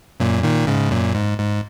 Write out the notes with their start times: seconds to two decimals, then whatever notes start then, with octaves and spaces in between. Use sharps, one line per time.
0.20 F#2 A#2
0.43 A#2 D#3
0.67 G#2 C#3
0.91 F#2 A#2
1.15 G#2
1.39 G#2